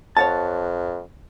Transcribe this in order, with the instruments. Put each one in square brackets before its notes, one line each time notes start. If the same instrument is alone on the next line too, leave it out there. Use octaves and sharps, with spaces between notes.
[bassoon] F2 [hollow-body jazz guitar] C#5 F#5 A5